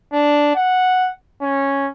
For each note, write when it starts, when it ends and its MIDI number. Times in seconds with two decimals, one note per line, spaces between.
0.13 0.55 62
0.55 1.11 78
1.41 1.90 61